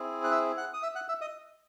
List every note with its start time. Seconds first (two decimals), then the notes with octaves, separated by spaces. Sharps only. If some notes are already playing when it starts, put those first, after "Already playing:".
Already playing: C4 E4 G#4
0.24 F#6
0.31 E5 E6
0.57 F#5 F#6
0.74 D#6
0.82 E5 E6
0.95 F#5 F#6
1.08 E5 E6
1.21 D#5 D#6